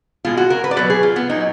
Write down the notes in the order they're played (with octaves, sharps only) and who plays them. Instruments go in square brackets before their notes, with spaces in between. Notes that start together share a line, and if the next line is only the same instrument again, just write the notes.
[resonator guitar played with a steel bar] B2 G#3 F4
F#4
A#4
B4
D5
B2 F#3 B4
G#4
F4
B3
A#2 F#3 D#4